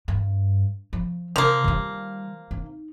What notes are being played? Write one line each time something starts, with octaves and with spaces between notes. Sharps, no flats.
G2
F3
C3 F3 A#3
D#3 G3
D#4